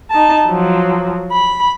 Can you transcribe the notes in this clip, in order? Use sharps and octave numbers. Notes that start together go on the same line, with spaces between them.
D#4 A5
F3 F#3
B5